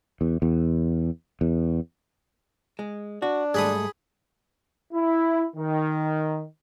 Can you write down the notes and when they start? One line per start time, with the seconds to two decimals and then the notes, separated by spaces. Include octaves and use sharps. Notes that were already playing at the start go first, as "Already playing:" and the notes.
0.21 E2
0.42 E2
1.41 E2
2.79 G#3
3.22 D4 F#4
3.54 G#2 G3 A3 G#4 B5 D#6
4.93 E4
5.56 D#3